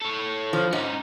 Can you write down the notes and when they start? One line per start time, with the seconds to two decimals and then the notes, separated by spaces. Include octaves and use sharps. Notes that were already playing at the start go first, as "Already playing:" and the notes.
0.02 A4 C#5
0.53 F3
0.73 G#2 C#4 D#4